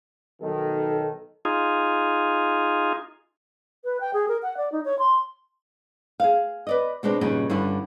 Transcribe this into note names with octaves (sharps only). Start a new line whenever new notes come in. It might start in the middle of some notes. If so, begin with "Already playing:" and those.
B1 D#3 A4
D#4 F4 G#4
B4
G5
G#4
A#4
F#5
D5
D#4
C#5
C6
G#4 F5
B4 D5 D#5
B2 G#3 C4 D4
G2 A#2 C#3 D#4 F#4
G2 D3 C#4 E4